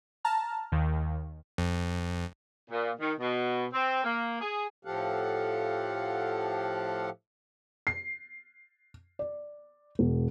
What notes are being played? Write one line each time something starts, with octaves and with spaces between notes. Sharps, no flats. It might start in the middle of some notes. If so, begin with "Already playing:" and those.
A5 A#5 F6
D#2 D#3
F2
A#2
D#3
B2
C4
A#3
G#4
A2 F3 G4 A4 F5 F#5
C7
D5
E1